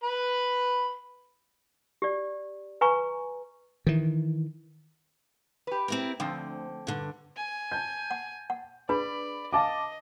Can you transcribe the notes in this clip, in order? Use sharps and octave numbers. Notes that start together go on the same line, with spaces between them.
B4 B5
G4 D5
B4 G#5 A#5 C#6
D#3 E3
G4 B4
C4 E4 A#4
D2 D3 F3 C4
G2 D3
G#5
A5 G6
F#5
F#5
D4 G#4 B4 D5 B5
D#5 F5 A5 D6